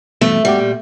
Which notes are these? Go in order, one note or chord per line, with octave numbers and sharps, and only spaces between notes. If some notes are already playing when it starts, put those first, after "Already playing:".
E2 G2 B2 A3
G#2 G3 F#4 G4
A#2